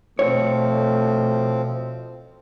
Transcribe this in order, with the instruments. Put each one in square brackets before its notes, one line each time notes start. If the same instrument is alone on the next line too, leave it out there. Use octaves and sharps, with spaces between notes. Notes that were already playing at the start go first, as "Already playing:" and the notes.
[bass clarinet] B2 [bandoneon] F3 C4 [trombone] A3 [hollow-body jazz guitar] C#5